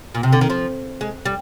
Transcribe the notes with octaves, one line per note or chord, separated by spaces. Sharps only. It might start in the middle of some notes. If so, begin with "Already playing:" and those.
A#2
C3
D3
D#3
F3
G#3
G3